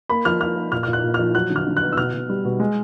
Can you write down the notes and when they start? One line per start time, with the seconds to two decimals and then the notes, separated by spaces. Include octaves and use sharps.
0.09 A#3 B5
0.25 F3 F6
0.40 F3 F6
0.56 A#3
0.72 A#2 F6
0.83 A#2 F6
0.93 F#6
1.03 A#2
1.14 F3 F6
1.35 F#3 F#6
1.50 D3
1.56 F6
1.67 D3
1.77 F#6
1.82 B3
1.92 E6
1.97 B2 F6
2.14 B2
2.29 G3
2.45 B2
2.60 G#3